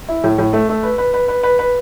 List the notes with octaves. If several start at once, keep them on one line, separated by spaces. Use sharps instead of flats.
E4
A2
A2
A3
A3
B4
B4
B4
B4
B4
B4